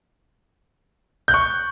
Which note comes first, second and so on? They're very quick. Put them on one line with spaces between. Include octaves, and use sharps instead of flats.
G6 F#6 C#6